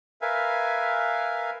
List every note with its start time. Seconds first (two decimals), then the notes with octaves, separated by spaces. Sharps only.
0.22 A#4 B4 E5 F5 G#5